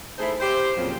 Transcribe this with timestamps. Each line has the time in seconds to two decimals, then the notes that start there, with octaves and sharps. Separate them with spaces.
0.19 A3 D#4 E4 G#4 C5
0.40 G4 C5
0.77 F2 A#2 C#3 F3 F#3 C4